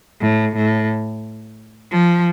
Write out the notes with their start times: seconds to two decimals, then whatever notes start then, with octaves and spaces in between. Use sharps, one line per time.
0.21 A2
0.56 A2
1.92 F3